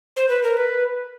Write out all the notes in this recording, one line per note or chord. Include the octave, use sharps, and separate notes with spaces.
C5
B4
A#4
B4